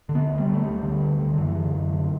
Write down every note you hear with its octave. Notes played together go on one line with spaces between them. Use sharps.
D3
B3
D2
G3
D3
A3
D2 G3
D3
D2
D3
D3
F#2 E3
D3
F#2
D3